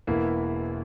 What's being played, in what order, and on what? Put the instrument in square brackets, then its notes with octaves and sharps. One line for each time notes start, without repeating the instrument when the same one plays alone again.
[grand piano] E1 E2 E3 A#3 E4